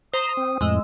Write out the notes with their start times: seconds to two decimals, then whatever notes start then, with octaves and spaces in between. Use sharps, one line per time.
0.14 C5 A#5 D#6
0.37 C4
0.61 F2 A2 G#3 D#5 E6